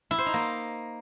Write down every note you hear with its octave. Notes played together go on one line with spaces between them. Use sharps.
E4
C5
D#4
A#3